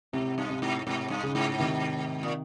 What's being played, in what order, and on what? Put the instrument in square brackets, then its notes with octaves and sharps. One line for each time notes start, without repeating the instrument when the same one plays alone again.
[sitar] G#2 [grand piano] C3
[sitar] G2
[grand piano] C3
[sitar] G#2
[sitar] G#2 [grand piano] C3
[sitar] G2
[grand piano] C#3
[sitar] G#2
[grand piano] C3 D#3
[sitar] A#2